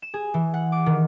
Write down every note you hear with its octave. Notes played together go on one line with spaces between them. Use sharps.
E7
G#4
E3
F#5
D6
D#3